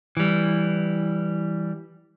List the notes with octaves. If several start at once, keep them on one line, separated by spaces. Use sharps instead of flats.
E3 G3